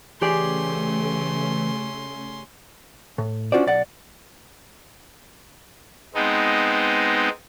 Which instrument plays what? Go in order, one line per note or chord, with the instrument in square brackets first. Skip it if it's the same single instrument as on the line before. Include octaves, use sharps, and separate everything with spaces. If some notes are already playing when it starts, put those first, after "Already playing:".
[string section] C#3 A3 [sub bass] E3 [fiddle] C#4 C6 [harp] G4 G#4 D5
[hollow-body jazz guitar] A2
C#4 D4 F4 F#4 C5 D5
B1 D5 F#5
[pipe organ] G#3 B3 C4 D#4